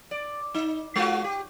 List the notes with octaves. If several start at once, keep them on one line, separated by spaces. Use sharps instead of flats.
D5
D#4
G#3 F4 F#4
G4